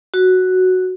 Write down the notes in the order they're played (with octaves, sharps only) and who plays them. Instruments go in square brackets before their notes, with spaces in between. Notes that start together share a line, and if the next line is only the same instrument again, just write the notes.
[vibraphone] F#4